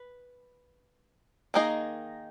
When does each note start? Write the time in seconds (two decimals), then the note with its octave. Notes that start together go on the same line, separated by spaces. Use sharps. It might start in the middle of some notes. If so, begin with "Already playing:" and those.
Already playing: B4
1.54 D#3 A#3 D#4 G#4 D#5